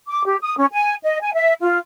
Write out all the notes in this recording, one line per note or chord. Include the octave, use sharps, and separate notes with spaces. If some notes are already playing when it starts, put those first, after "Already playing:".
D6
G4
D#6
C#4
G#5
D#5
G#5
E5
F4